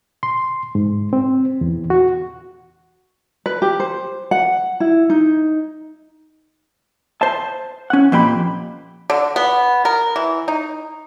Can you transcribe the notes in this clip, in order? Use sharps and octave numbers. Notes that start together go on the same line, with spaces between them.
C6
G#2
C4
E2
F#4
B4
G4
C5
F#5
E4
D#4
C5 A5
C#4 F#5
F2 A#2 G4 B5
D3
B3
A#4
E3
D#4